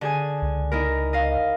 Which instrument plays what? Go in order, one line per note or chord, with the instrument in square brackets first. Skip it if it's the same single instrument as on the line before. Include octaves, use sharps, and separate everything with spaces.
[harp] D3 G#4 G#5
[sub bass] C#2
[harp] D#4 E4 A#4
D#5 F5